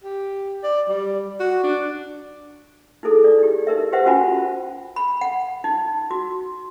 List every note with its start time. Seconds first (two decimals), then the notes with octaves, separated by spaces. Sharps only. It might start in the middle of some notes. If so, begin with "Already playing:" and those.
0.04 G4
0.63 D5
0.88 G3
1.40 F#4
1.63 D4
3.03 D#4 E4 G#4 A4
3.24 D5
3.39 D#4 G4
3.67 D#4 A#4 E5
3.92 G4 B4 C5 E5 F#5
4.06 C#4 F4 F#4 G#5 A5 B5
4.96 B5
5.21 F#5
5.64 D#4
6.11 F#4